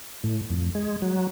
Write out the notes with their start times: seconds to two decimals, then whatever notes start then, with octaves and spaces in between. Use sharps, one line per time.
0.24 A2
0.50 F2
0.75 G#3
1.02 F#3